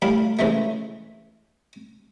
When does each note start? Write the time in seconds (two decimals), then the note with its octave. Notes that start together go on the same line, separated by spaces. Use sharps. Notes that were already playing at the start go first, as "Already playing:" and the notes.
0.02 A2 G3 F5 A5 B5
0.39 C#3 E3 G#3 A3